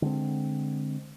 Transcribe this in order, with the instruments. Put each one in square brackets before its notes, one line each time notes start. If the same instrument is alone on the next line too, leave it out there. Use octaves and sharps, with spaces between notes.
[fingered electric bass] D3 G#3 C4